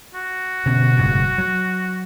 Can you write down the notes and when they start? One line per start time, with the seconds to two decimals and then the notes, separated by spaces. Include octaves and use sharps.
0.14 F#4
0.66 B2 D3 C#4
0.97 F#1 G#2 B2
1.38 F#3